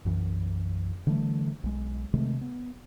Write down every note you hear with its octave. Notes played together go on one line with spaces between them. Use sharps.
B1 F#2 E3
D3 E3 G3 A3
B1 G#3
C3 D#3 G#3 A3
B3